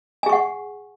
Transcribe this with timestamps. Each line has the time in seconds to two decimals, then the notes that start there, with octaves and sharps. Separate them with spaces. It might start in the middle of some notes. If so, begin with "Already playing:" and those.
0.23 G#5
0.26 G#4
0.29 C#6
0.33 F#5